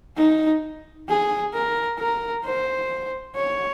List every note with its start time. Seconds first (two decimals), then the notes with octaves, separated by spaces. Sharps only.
0.17 D#4
1.08 G#4
1.53 A#4
1.99 A#4
2.45 C5
3.36 C#5